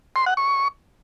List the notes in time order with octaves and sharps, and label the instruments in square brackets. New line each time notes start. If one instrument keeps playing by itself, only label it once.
[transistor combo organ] C6
F#5
C#6